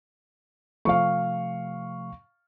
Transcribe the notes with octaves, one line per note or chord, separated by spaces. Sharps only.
C3 F3 A3 F5 C#6